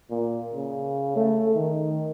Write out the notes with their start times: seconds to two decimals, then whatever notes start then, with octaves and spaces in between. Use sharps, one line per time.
0.11 A#2
0.54 C#3
1.16 A3
1.55 D#3